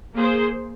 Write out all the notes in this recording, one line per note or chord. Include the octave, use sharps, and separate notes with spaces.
A#3 G#4 C5